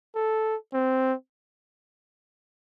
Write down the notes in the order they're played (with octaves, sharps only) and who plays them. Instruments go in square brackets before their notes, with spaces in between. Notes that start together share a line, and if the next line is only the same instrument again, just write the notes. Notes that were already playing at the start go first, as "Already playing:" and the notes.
[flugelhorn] A4
C4